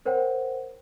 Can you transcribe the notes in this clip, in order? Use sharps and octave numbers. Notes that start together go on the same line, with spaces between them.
A#4 C5 C#5 F#5 G5